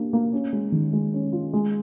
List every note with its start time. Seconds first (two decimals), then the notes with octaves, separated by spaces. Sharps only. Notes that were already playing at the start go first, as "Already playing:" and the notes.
Already playing: A#3 D4 G4
0.13 A#3
0.32 C#4
0.53 G#3
0.72 D#3
0.93 G#3
1.13 C#4
1.33 F4
1.53 G#3